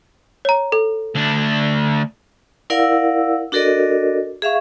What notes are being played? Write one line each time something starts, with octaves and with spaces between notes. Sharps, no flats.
C#5 A#5
A4
D2 D4
E4 A#4 D5 F5 F#5 E6
D4 F#4 A4 A#4 D5 D#5
G#4 E5 F5 C#6